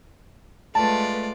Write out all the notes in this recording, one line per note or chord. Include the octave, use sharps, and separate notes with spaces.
G#3 A3 F4 B4 D5 A5